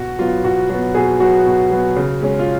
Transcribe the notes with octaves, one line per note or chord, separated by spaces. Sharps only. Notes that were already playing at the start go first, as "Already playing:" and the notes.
Already playing: B2 F#4
F#3 B3 F4
B2 F#4
F#3 B3
B2 G#4
F#3 B3 F#4
B2
F#3 B3
C#3
G#3 C#4
F4